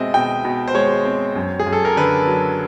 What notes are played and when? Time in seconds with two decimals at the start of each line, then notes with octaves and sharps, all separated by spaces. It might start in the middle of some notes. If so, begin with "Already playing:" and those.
Already playing: B2 G#3 C4 D#5 E5
0.14 B2 G5
0.45 B2
0.68 C5
0.75 G#3 C#5
1.05 C4
1.36 F#2
1.59 G#4
1.67 F#2
1.73 A4
1.85 A#4
1.97 D3 B4
2.27 F#3